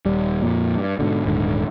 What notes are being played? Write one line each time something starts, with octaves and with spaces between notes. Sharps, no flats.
D#1 G3
F2 A#2
G2
G#2 B2 D3
D#1 G#2 D3